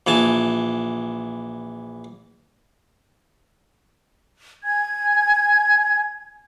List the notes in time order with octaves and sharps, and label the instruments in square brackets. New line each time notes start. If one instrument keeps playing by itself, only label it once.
[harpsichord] A#1 E3 G#5 A5
[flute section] G#5 G#6